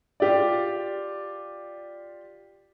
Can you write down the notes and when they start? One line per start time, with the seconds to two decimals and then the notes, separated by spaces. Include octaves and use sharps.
0.20 F4 G4 D5